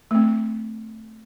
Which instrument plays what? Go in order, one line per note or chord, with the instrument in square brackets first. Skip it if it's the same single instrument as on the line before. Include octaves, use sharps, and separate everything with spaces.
[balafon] A3 C4